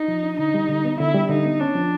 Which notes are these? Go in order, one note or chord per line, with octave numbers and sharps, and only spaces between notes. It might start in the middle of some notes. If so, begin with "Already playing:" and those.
Already playing: D#4
F3
D4
D3 D#4
G3
D3
B3
D3 E4
G3
D3 D#4
B3
C#4 D4
F3